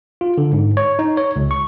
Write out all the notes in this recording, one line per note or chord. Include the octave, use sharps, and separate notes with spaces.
F4
D3
G#2
C#5
D#4
C#5
C#2
C#6